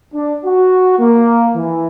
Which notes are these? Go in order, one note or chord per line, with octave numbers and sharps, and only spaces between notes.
D4
F#4
A#3
E3